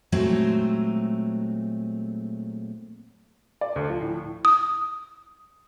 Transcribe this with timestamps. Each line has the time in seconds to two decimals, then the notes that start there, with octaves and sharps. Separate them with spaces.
0.12 A#2 F#3 G#3 A3 C4 D#4
3.61 D5
3.76 D2
3.89 F3
4.01 A2
4.45 D#6